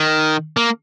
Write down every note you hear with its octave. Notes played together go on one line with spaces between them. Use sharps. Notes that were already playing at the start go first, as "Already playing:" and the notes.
Already playing: D#3
A#3